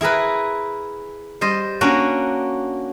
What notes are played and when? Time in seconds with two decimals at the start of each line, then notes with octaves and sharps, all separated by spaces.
0.01 E4 G#4 A#4 B4
1.41 G3 C5 D#5
1.81 A#3 C#4 D4 F#4